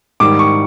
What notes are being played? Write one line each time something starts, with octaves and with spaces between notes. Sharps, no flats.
G#2 D#3 G3 D6
C#6